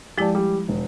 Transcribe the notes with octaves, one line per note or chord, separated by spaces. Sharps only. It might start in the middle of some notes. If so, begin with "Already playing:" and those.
F3 G#3 E4 G4 D5 A5
G3
E1